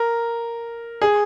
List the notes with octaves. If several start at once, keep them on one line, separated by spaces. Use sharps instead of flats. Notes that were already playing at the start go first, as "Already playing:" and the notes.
Already playing: A#4
G#4